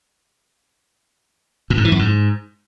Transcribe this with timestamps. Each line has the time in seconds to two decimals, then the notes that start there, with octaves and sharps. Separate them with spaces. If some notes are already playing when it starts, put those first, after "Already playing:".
1.70 A2
1.77 G#2
1.85 E3
1.92 F#2
1.99 G#2